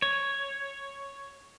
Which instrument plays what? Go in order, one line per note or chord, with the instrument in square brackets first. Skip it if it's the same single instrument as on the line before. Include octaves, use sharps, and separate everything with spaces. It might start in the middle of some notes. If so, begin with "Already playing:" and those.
[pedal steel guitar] C#5